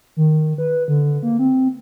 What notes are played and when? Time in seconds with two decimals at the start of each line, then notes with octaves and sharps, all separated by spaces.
0.17 D#3
0.58 B4
0.88 D3
1.23 A#3
1.39 C4